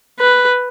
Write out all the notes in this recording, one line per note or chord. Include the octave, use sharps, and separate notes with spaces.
B4